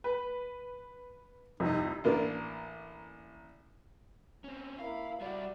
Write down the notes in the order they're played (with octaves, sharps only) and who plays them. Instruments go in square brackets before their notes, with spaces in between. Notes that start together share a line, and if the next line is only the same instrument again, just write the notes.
[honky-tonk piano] B4
[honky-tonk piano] C2 F2 C3 [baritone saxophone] D#4
[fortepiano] A1 A#3 D4
[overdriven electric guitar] C4 C#4
[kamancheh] A#3 E4 [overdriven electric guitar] F5
[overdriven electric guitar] G3 E4 [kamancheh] F#4 D5